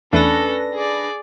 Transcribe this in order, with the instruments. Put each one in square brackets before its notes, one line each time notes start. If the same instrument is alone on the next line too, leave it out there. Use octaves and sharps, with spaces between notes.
[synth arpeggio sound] E2 E3 A3 [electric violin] C#4 A4 [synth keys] D4 B4 A#6
[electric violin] G#4 D5